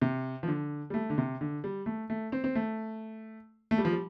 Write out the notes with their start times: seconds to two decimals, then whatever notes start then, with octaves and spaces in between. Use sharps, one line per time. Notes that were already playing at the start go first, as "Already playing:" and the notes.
0.02 C3
0.43 F3
0.48 D3
0.90 G3
0.94 A3
1.10 D3
1.18 C3
1.41 D3
1.64 G3
1.86 A3
2.10 A3
2.32 C4
2.44 C4
2.55 A3
3.71 A3
3.78 G3
3.85 F3
3.92 G3